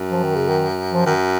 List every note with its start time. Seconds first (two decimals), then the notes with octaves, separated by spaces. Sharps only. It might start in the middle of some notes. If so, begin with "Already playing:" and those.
Already playing: F#2
0.11 F3
0.24 D#3
0.36 C#3
0.49 D#3
0.94 F3
1.06 F#2 D#3